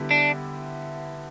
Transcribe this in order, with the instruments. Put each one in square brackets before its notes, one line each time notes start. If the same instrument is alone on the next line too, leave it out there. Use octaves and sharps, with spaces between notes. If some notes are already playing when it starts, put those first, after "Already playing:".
Already playing: [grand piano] D3 G3 B3 E4 G4
[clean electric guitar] D4